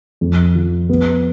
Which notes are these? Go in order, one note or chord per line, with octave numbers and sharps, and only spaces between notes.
F2
F3
B3